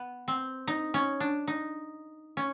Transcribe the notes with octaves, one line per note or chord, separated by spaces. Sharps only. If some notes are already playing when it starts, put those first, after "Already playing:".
Already playing: B3
C4
D#4
C#4
D4
D#4
C#4